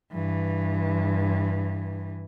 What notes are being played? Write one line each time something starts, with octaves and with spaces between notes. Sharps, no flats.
G2 E3